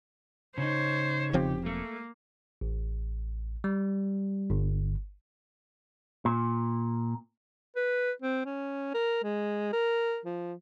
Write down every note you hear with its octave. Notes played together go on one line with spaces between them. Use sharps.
C#3 D#4 C5 C#5
E1 F3 C4 G4
A3 A#3
A1
G3
G1
A#2
B4
C4
C#4
A#4
G#3
A#4
F3